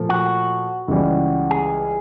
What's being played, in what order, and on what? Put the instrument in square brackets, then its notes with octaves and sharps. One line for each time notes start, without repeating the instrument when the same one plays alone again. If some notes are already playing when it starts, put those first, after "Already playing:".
Already playing: [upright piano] A#2 F3 A3
[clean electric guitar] F#4
[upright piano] C#2 C#3 E3 G3
[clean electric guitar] G#4